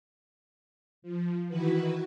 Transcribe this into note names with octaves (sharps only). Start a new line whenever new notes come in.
F3
D#3 E3 E4 F#4 B4